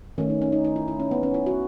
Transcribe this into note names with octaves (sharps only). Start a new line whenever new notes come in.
D#3 A3 C#4
D#4
C#4
D#4
D#4
E4
E4
C#4
B3
C#4
E4
F#4